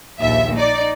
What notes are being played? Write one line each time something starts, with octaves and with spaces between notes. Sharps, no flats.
A#1 D#2 E5
D#4 D5